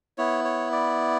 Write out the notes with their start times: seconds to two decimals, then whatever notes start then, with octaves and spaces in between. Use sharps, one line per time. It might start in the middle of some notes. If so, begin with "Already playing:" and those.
0.18 B3 E4 C#5
0.45 C#5
0.72 D5